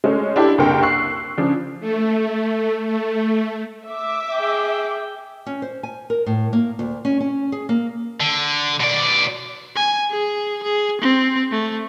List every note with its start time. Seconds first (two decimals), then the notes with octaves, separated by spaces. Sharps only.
0.04 G#3 A3 C#4
0.36 D4 E4 G4 A4
0.58 F#1 C2 D3 A#4 G5 C6
0.83 C#6 E6 F#6 C7
1.38 C#3 F3 D4
1.80 A3
2.86 A3
3.88 E5 D6
4.34 G#4 G5
5.46 C#4
5.62 C5
5.83 G#5
6.10 A#4
6.26 A2
6.53 A#3
6.79 D2
7.05 C#4
7.20 C#4
7.52 G#4
7.69 A#3
8.20 D3
8.80 B2 D5
9.76 G#5
10.11 G#4
10.63 G#4
11.02 C4
11.51 A3